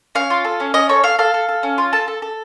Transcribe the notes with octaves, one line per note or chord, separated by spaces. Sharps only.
C#4 F5
F4
A4
C#4
C#4 D#5
A4 C#5
A4 F5
A4 F5
A4
A4
C#4
F4
A4 A5
A4
A4